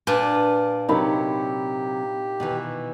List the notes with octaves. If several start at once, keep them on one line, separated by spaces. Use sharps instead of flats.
A#2 D4 B4
C3 F#3 C4 D#4 G4 A#4 B5
B2 D#3 E3